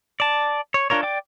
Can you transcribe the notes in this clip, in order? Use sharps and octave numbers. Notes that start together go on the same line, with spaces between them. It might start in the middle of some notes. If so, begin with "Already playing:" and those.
D5 A5
C#5
D4 F4 A#4 C#5
D5 G5 D6